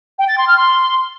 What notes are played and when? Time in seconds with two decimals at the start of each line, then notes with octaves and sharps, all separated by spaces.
0.19 G5
0.28 A6
0.38 C6
0.47 F6
0.57 C6